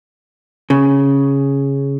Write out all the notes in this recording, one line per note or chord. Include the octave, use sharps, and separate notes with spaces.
C#3